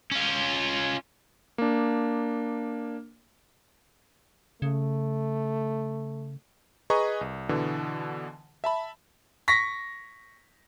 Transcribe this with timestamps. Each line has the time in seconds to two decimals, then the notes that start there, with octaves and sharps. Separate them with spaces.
0.11 C#4 F4
1.58 A#3 D4
4.62 C#3 A3
6.90 G#4 B4 D#5 A#5 C#6
7.21 C2
7.49 B2 D3 E3
8.64 E5 A5 B5
9.48 C#6 A#6 B6